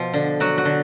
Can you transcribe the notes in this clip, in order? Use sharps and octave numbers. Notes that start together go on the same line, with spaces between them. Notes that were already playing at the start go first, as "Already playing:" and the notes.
Already playing: B2 F3
D3
F#3 F#4
F#4
D3